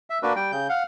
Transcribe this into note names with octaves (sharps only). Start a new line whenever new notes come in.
E5
A#3 D4 F#4 B4
G3 G5
C#3 G6
F5 F#5